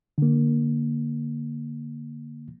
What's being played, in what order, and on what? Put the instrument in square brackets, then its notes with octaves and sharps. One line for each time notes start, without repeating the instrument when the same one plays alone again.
[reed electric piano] D3 A#3